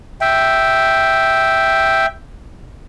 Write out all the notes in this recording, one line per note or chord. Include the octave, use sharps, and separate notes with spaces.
E5 G5